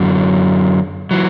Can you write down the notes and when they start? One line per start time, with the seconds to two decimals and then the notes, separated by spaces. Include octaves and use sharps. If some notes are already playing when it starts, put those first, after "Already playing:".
Already playing: F#2 D3 F#3
1.11 E3 F#3